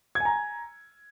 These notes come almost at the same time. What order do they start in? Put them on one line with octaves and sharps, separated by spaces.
G#6 G#5 A#5